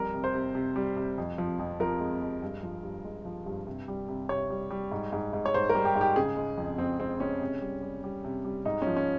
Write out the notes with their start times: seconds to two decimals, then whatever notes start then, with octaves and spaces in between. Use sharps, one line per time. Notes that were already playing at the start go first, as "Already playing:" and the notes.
Already playing: F2 G3 A#4
0.14 C3
0.24 C5
0.34 C3
0.55 C3
0.76 G3
0.96 C3
1.18 F2
1.38 F3
1.59 F2
1.80 F3 A#4
2.00 G#3
2.21 G#3
2.42 G2
2.63 F3
2.83 G2
3.04 G#3
3.25 F3
3.46 G2
3.67 C3
3.88 G3
4.09 C3
4.29 C3 C#5
4.50 G3
4.70 G3
4.91 G#2
5.12 G#2
5.33 G#2
5.46 C#5
5.54 G#2 C5
5.69 A#4
5.75 G3
5.85 G4
5.95 G#2
6.01 G4
6.16 C#3 G#4
6.37 G#3
6.58 F2
6.78 F2 C4
6.99 G#3 C4
7.20 G#3 C#4
7.41 C3
7.62 G3
7.83 G3
8.04 G3
8.24 C3
8.45 G3
8.65 G#2 D#4
8.82 F3 C#4
8.97 C#4